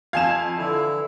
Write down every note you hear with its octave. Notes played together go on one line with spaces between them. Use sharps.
F2 F5 G#5 G#6 E7
D3 E3 E4